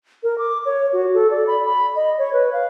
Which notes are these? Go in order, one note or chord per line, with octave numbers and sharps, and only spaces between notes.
A#4
D6
C#5
F#4
A4
D5
B5
B5
D#5
C#5
B4
F5